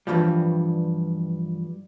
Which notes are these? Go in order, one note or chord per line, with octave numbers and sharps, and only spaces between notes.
G2 A#2 E3 F3 G3